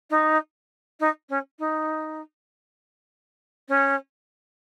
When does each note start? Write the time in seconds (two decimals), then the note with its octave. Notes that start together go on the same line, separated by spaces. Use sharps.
0.10 D#4
1.00 D#4
1.29 C#4
1.59 D#4
3.68 C#4